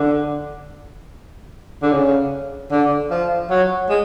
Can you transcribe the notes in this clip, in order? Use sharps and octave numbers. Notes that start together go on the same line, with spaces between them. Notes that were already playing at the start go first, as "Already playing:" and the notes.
Already playing: D3
D3
C#3
D3
F3
F#3
G#3